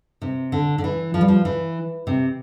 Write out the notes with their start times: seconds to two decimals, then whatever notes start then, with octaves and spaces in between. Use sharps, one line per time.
0.22 C3
0.52 D3
0.78 D3
0.84 E3
1.14 F3
1.21 G3
1.28 F3
1.45 E3
2.07 C3